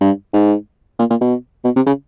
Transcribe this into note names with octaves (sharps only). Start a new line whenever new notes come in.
G2
G#2
A#2
A#2
B2
B2
C3
C#3